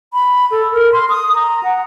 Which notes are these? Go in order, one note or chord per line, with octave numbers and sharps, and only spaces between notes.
B5
A4
A#4
C6
D#6
A#5
F#5